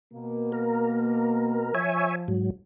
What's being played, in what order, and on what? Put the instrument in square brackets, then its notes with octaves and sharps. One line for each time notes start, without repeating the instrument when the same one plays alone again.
[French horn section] B2 A#3
[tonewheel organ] A#4
[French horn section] F3 [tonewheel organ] C#5 E5 G#5
[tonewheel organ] G#2 F#3